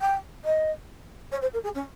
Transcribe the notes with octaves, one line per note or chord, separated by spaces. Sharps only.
G5
D#5
C#5
C5
A#4
G#4
C#4